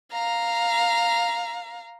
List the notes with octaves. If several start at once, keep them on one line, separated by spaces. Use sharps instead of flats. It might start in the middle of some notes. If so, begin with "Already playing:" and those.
F5 A#5